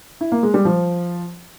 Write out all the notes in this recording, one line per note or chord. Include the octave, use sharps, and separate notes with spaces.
E4
A#3
G#3
G3
F3